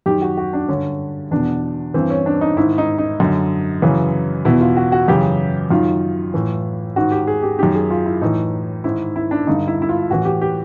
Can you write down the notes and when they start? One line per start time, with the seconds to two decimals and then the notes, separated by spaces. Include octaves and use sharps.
0.06 F#2 D#3 G4
0.22 F#4
0.37 F#4
0.53 D4
0.68 G2 D3 C#4
1.31 E2 B2 D4
1.94 G2 E3 C4
2.10 C#4
2.26 D4
2.41 D#4
2.57 G#2 D#3 E4
2.78 D#4
2.98 D#4
3.20 F#2 D3
3.82 F#2 C#3 E3
4.45 E2 B2 E4
4.61 F4
4.77 F#4
4.92 F#4
5.08 F#2 C#3 E3 G4
5.71 F#2 D#3 F4
6.34 A2 E3
6.96 G#2 D#3 F#4
7.12 G4
7.27 G#4
7.43 G4
7.59 F#2 D#3 G4
7.75 G#4
7.90 F4
8.06 E4
8.21 A2 E3 D#4
8.84 G#2 D#3 E4
9.16 E4
9.31 D4
9.47 G2 D3 D#4
9.68 E4
9.82 E4
9.89 F4
10.10 A2 E3 F#4
10.25 G4
10.41 G4